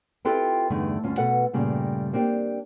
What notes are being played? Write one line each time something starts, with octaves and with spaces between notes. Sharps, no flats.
C4 E4 F4 G4 A4 B4
E2 G2 D3 A3 D#4
D2 G2 C#4 F4
B2 A4 B4 F#5
G2 A#2 C#3 G3 A3
A#3 C4 D4 G4